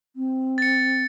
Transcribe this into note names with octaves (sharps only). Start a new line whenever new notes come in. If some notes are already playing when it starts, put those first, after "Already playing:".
C4
A6 C#7